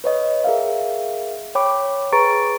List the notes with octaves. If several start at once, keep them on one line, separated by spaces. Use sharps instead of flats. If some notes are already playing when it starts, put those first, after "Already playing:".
B4 C#5 D#5
G#4 A#4 E5 F5
C#5 G5 B5 D6
G#4 B4 A#5 C#6 A6 D7